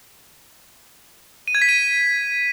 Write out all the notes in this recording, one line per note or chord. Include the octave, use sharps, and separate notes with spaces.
D#7
G#6
B6
D#7